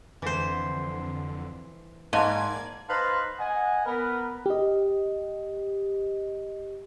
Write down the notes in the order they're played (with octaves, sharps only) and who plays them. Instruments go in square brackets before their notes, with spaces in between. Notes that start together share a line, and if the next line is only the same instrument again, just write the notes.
[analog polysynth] F2 D3 [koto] E3 C5
[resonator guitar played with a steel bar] G#2 [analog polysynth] A#3 D5 G#6 [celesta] F5 A5 C6 [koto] G#5
[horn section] D#4 B4 C5 F5 A5 A#5
D#5 F#5 G#5
B3 A#4 B4
[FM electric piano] G4 D#5